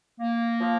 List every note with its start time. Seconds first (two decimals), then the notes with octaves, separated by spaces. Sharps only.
0.20 A#3
0.60 F3